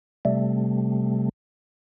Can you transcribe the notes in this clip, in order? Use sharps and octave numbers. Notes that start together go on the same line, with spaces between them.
C3 G3 A3